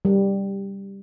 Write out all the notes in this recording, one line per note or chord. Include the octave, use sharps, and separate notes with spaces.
G3